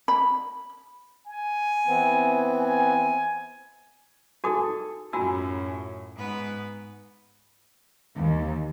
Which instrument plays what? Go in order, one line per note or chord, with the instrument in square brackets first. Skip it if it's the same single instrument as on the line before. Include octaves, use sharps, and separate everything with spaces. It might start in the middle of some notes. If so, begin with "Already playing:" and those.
[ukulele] B5
[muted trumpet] G#5
[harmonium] E3 B3 C4
[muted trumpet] G#5
[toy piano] F#4 G#4 D#6 [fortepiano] A4 G#5
[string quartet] F#2 A2 C#3 [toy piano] F4 F#4 E6 [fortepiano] G#5
[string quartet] G#2 B3 B4
[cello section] D#2